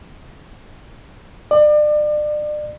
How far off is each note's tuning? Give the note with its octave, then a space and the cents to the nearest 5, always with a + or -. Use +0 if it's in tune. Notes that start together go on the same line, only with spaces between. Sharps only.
D5 +35